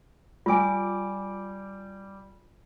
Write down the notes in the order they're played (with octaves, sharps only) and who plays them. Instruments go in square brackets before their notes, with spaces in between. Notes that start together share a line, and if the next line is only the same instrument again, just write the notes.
[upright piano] G3 D6 [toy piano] F4 G#5